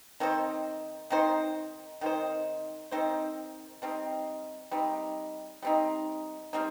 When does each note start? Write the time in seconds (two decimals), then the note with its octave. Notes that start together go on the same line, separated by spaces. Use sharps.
0.20 D#3 C4 D#4 C5
1.10 D#3 C4 D#4 C5
2.01 D#3 C4 D#4 C5
2.91 D#3 C4 D#4 C5
3.82 G3 C4 D#4
4.71 G3 C4 D#4
5.63 G3 C4 D#4
6.53 G3 C4 D#4